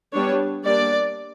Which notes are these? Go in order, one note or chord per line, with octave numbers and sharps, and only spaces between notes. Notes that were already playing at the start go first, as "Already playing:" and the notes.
G3 B3 D4 C#5
G3 A#3 D4 D5